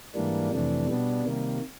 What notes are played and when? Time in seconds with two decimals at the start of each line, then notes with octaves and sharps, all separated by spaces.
0.15 G#2 E3 G3 A#3 D4
0.52 F2 C3 E3 A3 D4
0.87 B2 G3 B3 D4
1.24 C3 D#3 G3 A#3